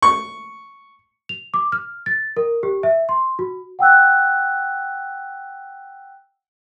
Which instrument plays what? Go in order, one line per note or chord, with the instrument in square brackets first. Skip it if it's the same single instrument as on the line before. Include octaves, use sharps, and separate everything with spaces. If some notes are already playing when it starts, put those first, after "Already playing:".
[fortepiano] C#6
[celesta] F7
D6
F6
A6
A#4
G4
E5
C6
F#4
F#5 G5 E6 F#6